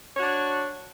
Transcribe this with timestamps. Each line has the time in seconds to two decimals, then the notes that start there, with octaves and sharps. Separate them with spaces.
0.15 C#5
0.19 F#4
0.22 D4